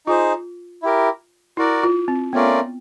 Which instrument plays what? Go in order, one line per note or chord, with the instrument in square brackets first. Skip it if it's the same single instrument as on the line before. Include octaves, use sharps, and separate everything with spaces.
[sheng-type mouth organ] D#4 G#4 C5 [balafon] F4
[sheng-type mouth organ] E4 G4 A#4
[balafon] E4 [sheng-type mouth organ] F#4 A#4 D5
[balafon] F4
C4
[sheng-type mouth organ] A3 C#4 F4 A#4 D5 [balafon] B3